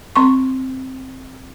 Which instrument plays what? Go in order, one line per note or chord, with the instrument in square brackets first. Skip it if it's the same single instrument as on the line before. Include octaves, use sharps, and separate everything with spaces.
[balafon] C4 C6 C#6